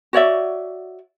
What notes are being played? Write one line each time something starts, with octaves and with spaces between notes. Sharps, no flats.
F#4 C#5 D5 E5